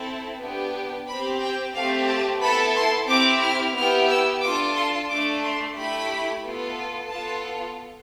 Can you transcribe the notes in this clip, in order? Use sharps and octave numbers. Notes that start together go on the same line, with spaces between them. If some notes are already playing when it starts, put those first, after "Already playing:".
Already playing: C4 E4 A4
B3 D4 G4
C4 G4 B5
G5
A3 C4 G4 F5
A5
B3 E4 A4 B5
C6
C4 E4 G4 D6
F6
B3 E4 G4 F6
E6
D4 F4 A4 D6
C6
A3 D4 A4 D6
C6
A3 E4 G4 B5
B3 F4 A4
B3 F4 A4 A5